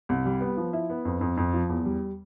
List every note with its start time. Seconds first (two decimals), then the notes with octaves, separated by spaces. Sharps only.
0.09 C2
0.25 G3
0.41 B3
0.57 F3
0.73 E4
0.90 B3
1.05 F2
1.21 F2
1.37 F2
1.54 F3
1.69 E2
1.85 G3